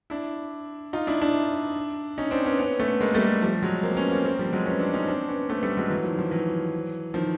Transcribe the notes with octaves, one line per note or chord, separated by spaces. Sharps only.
D4 E4
D#4 F4
D4 E4
D4 E4
C#4 D#4
C4 D4
B3 C#4
B3 C#4
A3 B3
G#3 A#3
G3 A3
F3 G3
F#3 G#3
A#3 C4
B3 C#4
A#3 C4
A#3 C4
F3 G3
F#3 G#3
B3 C#4
C4 D4
C#4 D#4
C4 D4
B3 C#4
A3 B3
G3 A3
F#3 G#3
E3 F#3
D#3 F3
D#3 F3
E3 F#3
D#3 F3